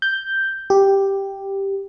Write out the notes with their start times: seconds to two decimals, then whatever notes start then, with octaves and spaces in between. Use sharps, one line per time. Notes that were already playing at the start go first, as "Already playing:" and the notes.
0.02 G6
0.70 G4